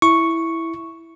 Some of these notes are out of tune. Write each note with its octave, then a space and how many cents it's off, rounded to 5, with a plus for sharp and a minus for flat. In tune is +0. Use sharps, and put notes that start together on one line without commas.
E4 +0 C#6 +0